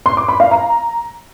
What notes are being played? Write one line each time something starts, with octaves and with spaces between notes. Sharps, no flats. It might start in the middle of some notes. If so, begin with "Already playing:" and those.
C6
D6
B5
F5
A#5